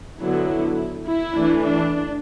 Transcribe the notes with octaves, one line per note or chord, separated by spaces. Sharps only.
D3 F#3 B3 E4
E4
E3 A3 D4
D4